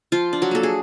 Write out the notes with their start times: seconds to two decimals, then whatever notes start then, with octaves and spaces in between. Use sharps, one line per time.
0.12 F3 F4
0.33 D4
0.42 F#3 F#4
0.51 A#3 A4
0.63 G#4